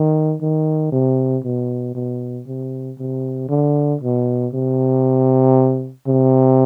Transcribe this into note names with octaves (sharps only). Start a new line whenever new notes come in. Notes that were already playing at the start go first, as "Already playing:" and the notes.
Already playing: D#3
D#3
C3
B2
B2
C3
C3
D3
B2
C3
C3